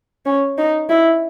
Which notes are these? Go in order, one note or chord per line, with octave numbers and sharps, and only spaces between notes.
C#4
D#4
E4